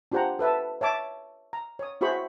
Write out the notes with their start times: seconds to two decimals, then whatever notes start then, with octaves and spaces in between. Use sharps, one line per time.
0.12 D4 F4 G4 C5 F#5 A#5
0.39 A4 B4 E5 A5
0.81 C#5 E5 A5 D6
1.53 A#5
1.79 C#5 D#6
2.01 E4 F#4 G#4 C5 B5 C#6